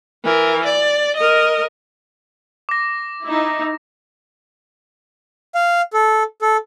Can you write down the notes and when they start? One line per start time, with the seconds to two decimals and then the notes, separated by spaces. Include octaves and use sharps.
0.24 E3 A#4
0.65 D5
1.16 A#4 D#5
2.69 D6 A#6
3.23 D#4 E4
5.55 F5
5.93 A4
6.42 A4